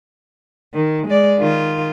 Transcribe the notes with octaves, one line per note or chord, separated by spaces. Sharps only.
D#3
G#3 D5
D#3 F4